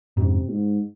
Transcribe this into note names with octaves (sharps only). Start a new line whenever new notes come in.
F2 G#2 C3
G#2